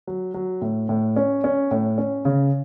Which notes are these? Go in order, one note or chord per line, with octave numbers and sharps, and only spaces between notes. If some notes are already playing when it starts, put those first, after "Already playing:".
F#3
F#3
A2
A2
C#4
C#4
A2
C#4
C#3